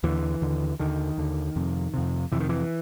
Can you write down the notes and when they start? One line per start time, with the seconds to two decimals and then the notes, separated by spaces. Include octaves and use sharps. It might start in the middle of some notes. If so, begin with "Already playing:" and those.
0.03 D#2 D3 E3
0.41 D#2 D3
0.79 D#2 D3 D#3
1.18 D#2 D3
1.56 F2 C3
1.94 F2 C3
2.32 F2 C3 E3
2.40 D#3
2.49 E3